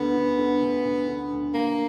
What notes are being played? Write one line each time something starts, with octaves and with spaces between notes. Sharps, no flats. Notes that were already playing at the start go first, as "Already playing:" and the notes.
Already playing: D2 D3 B3
D3
D3
D2
D2
D3
D2
D2 A#3